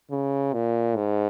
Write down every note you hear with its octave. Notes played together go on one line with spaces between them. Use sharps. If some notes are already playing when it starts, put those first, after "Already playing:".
C#3
A#2
G#2